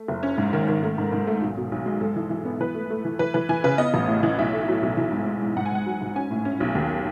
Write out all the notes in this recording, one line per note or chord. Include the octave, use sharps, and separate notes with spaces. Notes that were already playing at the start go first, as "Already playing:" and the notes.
Already playing: A3
F#1
C#4
G#2
D#3
D#3
A3
G#2
G#2
A3
B1
B2
B1
G#3
G#2 A4
E3
E3
B3
E3 B4
A3
A3
E3
E3 B4
E3 B4
E3 G#5
C#3 B4
B3 D#5
A1
A2
E3
B1 E5
A3
F#3
B1
E3
G#2
G#3
G#3
G#2 F#5
G#5
G#2 F#5
F#3
G#2
C#4 G#5
A2
C#4
B1
D#2